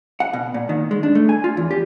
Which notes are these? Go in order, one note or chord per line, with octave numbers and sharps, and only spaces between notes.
F#5
B2
A#2
D#3
G#3
D4
A3
G#5
F4
E2
G4